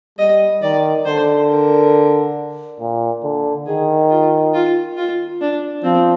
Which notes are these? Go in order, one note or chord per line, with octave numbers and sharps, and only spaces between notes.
G3 D#5
D#3 D5
D3 C5
A#4
A#2
D3
D#3 G#4
F4
F4
F4
D4
F3 C4